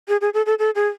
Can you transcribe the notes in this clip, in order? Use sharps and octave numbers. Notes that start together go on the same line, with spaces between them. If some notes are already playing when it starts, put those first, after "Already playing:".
G#4
G#4
A4
A4
A4
G#4